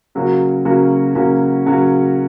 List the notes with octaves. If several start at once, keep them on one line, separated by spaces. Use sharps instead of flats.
C#3 F#3 A#3 C#4 F#4
C#3 F#3 A#3 C#4 F#4
C#3 F#3 A#3 C#4 F#4
C#3 F#3 A#3 C#4 F#4